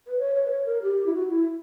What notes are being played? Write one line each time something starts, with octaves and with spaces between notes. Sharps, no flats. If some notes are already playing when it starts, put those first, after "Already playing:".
B4
C#5
C#5
B4
C#5
A#4
G4
E4
F#4
E4